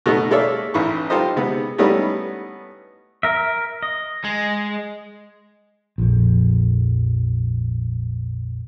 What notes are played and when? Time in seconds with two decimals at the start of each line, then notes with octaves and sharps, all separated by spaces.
0.06 B2 A3 D#4 F#4 A4
0.31 G#3 A#3 A4 C#5 D5 E5
0.74 A1 E3 B5 C#6
1.10 D#4 F4 G4 A4 C5 D#5
1.36 C3 G#3 B3
1.78 G3 A3 B3 C#4 D#4 E4
3.23 A#4 E5
3.82 D#5
4.24 G#3
5.98 A#1 F2